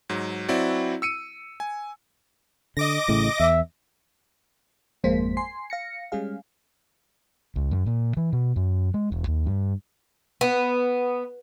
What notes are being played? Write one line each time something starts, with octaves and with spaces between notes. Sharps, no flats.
G#2 F#3
F#3 C4 E4 F#4 D5
E6 C#7 D#7
G#5
D3 D#5 D6 A#6
A1 A2 C#3
E2 E5
G#1 F2 G#3 A#3 C5 B6
G#5 C6 C7
F5 A#6 C#7
G3 G#3 C#4 G#4 F5
C#2
F#2
A#2
E3
B2
F#2
G#3
E1
D#2
G2
B3